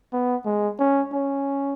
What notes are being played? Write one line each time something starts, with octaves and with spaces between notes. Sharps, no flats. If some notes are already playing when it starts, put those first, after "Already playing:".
B3
G#3
C#4
C#4